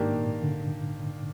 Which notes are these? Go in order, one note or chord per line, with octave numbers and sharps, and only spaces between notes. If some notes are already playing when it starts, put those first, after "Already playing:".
Already playing: G#2 D#3 A#3 D4 G4
A#2
D3